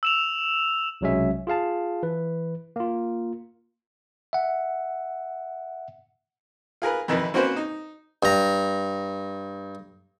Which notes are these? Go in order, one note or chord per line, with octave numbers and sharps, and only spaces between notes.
E6 E7 F7
B1 C3 F#3 G#3 C#4 E5
F4 G#4 F5 A5
E3 B4
A#3 F4
E5 F#5
F4 G#4 A#4 B4
F2 D#3 E3 B4
A#3 C4 C#4 F#4 B4 C5
D#4
G2 A#5